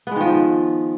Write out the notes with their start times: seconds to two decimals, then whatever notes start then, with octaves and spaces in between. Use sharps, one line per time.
0.07 B3
0.11 G#3
0.16 D#3
0.21 F3